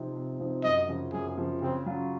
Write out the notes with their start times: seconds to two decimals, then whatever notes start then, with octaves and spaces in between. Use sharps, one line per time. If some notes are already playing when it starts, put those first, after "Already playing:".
Already playing: C3 F3 C4 D#4
0.15 C3
0.40 F3 C4 D#4
0.64 F#2 D#5
0.89 C#3 F3
1.13 F#2 G#4
1.37 C#3 F3
1.62 C#3 C4
1.86 F#3 C#4 F4